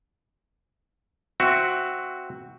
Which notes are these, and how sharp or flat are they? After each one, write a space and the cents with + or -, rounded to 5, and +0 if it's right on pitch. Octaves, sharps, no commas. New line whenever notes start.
C4 +0 F#4 +0 E5 +20